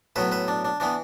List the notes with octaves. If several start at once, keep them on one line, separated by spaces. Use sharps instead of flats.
A2 F#3 B3 B4 E5
B4 E5
D4
D4
E3 B3 D4